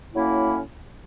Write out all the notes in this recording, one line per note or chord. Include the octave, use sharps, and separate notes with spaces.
A2 F#3 A#3 C#4 E4